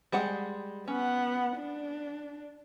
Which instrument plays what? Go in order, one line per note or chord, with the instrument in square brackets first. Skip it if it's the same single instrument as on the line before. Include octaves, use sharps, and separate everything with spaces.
[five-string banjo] G3 G#3 F#5
[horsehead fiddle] B3 F#5 [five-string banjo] C#4
[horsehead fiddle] D4